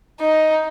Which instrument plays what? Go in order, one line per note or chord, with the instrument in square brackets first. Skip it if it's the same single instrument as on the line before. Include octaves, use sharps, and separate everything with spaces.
[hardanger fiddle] D#4